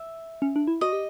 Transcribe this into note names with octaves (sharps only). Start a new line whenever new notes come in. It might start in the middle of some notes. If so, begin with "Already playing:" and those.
Already playing: E5
C#4
D4
E4
F#4 D#5
G4